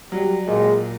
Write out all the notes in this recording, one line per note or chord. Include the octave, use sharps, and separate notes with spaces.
F#3 G3
A#2 G#3